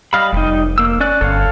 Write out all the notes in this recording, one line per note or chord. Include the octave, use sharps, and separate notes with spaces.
G3 D#5 F5 B5
F1 G3 D#4
A#3 E6
C#4 D5 F#6
G1 A4 C#5 F5